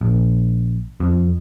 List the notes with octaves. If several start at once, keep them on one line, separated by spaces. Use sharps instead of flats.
A#1
F2